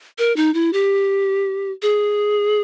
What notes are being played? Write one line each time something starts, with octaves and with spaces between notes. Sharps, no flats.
A#4
D#4
E4
G4
G#4